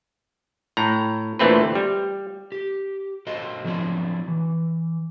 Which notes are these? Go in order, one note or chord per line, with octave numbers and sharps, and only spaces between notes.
A2 A#5
D2 A#2 E3 A3 C4 B4
G3
G4
F#4 A4 C5 D#5
D3 F3 F#3 C4 D4 E4
E3